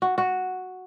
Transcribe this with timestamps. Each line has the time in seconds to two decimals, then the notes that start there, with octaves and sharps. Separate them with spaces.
0.02 F#4
0.18 F#4